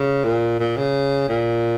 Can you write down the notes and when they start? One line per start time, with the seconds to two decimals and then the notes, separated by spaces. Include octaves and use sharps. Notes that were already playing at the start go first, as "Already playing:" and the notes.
Already playing: C#3
0.24 A#2
0.60 A#2
0.77 C#3
1.29 A#2